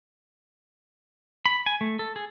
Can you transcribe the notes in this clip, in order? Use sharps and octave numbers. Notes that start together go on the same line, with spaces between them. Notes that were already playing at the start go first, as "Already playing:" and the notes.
B5
G#5
A3
A4
G#4